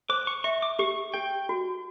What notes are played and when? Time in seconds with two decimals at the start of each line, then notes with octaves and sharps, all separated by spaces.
0.09 C5 D6
0.27 C#6
0.44 E5 C#6
0.62 D6
0.79 G4 C#6
1.14 G4 G5
1.49 F#4